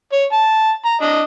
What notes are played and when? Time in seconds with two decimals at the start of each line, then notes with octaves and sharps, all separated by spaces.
0.12 C#5
0.32 A5
0.85 A#5
1.02 D4 D#5